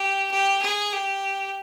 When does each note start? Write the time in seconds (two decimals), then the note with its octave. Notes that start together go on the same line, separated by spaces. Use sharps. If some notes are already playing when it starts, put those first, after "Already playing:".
Already playing: G4
0.31 G4
0.62 G#4
0.93 G4